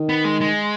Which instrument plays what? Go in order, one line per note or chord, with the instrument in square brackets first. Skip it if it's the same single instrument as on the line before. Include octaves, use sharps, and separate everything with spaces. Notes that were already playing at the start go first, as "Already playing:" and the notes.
Already playing: [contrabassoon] D#3
[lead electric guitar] B3
G#3
G#3